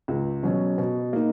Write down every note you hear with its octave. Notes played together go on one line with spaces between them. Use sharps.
C#2
B2 F#3 C#4
B2
A#3 D#4